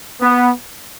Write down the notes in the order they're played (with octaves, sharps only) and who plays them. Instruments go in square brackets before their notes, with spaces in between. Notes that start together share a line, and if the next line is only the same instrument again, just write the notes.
[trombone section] B3